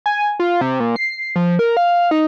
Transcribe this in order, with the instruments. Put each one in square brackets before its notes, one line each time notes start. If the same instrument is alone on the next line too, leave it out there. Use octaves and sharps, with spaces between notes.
[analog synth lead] G#5
F4
C3
A#2
C7
F3
A#4
F5
D#4